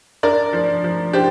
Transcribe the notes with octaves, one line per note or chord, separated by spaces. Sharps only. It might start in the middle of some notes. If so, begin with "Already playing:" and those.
D4 A#4 D5
F3
F3
D4 G4 C5